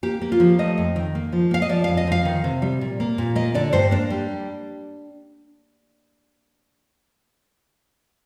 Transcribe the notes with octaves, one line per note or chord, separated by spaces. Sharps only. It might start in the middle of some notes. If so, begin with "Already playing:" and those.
A#3 G4
A#3
F4
F3
A3 D#5
F2
D#3
A#3
F3
A#3 F5
D#5
F3 D5
F2 F5
D#5
F3 F5
D#3
C3
G3
A#2
A#3
A#2
A#3 D#5
D3 D5
G2 C5
A#3 D4
G3